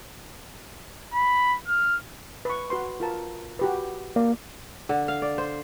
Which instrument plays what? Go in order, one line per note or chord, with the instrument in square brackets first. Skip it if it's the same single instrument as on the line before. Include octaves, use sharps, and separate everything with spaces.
[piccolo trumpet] B5
F6
[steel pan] B4 C#6
F#4 B4 C6
F4 A#4 A5
F#4 G4 B4
[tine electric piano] A#3 [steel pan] D5
[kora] D3
F5
D5
C5